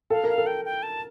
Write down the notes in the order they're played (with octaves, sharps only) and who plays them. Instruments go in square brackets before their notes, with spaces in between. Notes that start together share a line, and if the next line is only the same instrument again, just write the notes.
[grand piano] A4 [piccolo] F5
[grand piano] A#4
[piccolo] F5
[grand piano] A4
[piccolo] G5
G5
A5